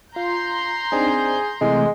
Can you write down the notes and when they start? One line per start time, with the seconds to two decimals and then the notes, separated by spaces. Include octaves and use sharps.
0.16 F4 A#5 C6 G6
0.92 C4 D4 D#4 G#4
1.61 C3 E3 G#3 A3